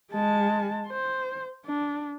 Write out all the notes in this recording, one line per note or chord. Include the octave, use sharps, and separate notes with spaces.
G#3 A5
C5
D4